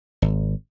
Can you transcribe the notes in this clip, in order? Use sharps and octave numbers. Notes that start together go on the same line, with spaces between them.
G#1